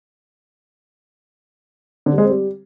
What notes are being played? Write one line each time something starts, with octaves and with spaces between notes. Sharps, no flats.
D3
G3
G#3
C4
G3